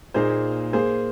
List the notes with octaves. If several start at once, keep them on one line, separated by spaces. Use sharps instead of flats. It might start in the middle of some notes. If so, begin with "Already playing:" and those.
A#2 A#3 D#4 G#4 C5
A#3 G#4 C5